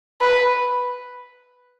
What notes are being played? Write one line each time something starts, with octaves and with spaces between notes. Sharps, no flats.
B4